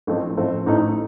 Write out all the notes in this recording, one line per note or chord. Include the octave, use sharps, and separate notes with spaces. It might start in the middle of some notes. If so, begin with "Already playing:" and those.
A1 A2 F3 A3 C4
A1 A2 F3 A3 C4
A1 A2 A3 D#4